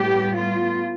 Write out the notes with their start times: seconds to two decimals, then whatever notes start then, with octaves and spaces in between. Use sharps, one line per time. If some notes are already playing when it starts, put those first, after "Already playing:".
Already playing: A2 G3 B3 G4
0.36 F4